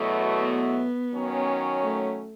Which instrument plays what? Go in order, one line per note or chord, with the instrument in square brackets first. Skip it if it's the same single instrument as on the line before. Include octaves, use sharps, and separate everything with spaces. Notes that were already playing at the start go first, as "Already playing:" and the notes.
Already playing: [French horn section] E2 B2 F#3 A3
[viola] B3
[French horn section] D#3 F#3 C#4
[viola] A3